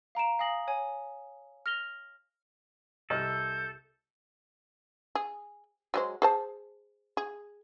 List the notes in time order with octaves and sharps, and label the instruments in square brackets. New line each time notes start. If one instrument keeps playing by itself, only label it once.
[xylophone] F5 A#5 D7 E7
F5 G#5 D#6 A#6 F#7
C#5 G#5
F6 A#6 F7 G7
[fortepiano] C2 D#5 F6 [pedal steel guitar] A4 [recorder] G6
[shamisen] G#4
F#3 G#3 C5
G#4 C5 A5
G#4